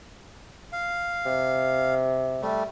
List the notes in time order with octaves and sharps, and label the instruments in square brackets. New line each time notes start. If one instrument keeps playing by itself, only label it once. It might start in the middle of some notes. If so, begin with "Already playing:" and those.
[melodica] F5
[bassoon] C3
[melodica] G3 A3